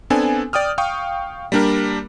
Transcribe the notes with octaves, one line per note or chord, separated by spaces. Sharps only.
B3 C4 D4 A4 G#5
D5 G5 D#6 F6
F5 G5 C#6 D#6
G3 A#3 D4 G4 A#4